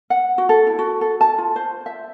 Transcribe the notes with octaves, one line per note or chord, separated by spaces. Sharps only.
F#5
F#4
A4
E4
F#4
A4
A5
F4
C5
E5